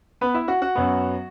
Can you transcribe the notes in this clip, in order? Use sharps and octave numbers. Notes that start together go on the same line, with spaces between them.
B3 B4
E4 E5
F#4 F#5
F#4 F#5
F#2 F#3 B3